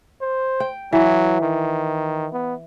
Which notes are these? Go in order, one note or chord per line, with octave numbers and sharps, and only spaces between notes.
C5
G5
E3 F#3
D#3
B3